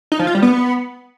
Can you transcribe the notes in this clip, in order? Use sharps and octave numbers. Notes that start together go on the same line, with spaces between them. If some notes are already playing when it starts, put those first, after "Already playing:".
D#4
F3
F4
G3
B3